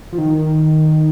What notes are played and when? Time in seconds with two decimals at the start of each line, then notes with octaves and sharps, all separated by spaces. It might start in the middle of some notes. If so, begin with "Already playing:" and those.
0.13 F3
0.18 D#3